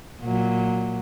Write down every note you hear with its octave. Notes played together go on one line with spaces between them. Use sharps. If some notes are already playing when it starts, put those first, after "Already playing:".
A#2 F#3